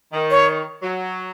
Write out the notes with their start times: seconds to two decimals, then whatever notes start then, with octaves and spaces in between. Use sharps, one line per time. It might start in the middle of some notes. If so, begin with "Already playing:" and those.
0.13 D#3
0.31 C#5
0.83 F#3